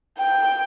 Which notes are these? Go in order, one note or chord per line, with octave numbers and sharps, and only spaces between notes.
G5